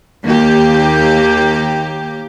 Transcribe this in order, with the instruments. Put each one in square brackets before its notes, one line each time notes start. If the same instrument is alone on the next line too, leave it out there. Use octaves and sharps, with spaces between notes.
[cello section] D#2 A#3 G4